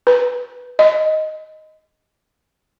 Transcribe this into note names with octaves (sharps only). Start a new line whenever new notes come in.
B4
D#5